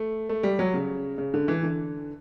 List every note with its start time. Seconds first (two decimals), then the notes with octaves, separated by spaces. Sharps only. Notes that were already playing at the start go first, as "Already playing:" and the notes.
Already playing: A3
0.29 A3
0.43 G3
0.59 F#3
0.74 C#3
1.18 C#3
1.34 D3
1.48 E3
1.63 D3